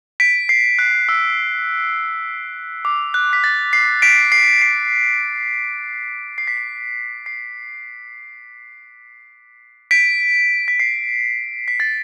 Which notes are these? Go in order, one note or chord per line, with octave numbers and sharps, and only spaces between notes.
B6 D7
C7
F#6
E6
D6
F#6
B6
A6
C7
B6 D7
C7
C7
C7
B6
C7
C7
B6 D7
B6
C7
B6
A6